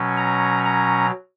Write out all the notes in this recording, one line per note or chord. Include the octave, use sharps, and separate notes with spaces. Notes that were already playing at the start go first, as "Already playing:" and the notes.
Already playing: B2 F#3 C#4
A#5
A#5